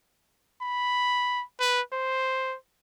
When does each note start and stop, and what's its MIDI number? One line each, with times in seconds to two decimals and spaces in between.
0.62 1.43 83
1.60 1.81 71
1.93 2.56 72